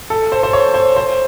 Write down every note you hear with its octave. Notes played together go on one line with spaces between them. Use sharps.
A4
C5
C5
C#5
C5
C5